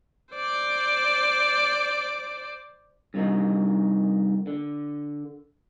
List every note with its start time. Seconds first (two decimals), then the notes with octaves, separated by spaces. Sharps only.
0.35 C5 D5
3.14 G2 C3 D#3 D#4
4.47 D3